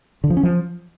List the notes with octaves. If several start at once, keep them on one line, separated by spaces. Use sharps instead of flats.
D3
F3
C#4
F3